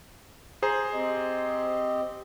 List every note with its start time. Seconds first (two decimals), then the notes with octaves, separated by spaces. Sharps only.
0.62 G#4 C5 A#5
0.94 C4 G4 D#5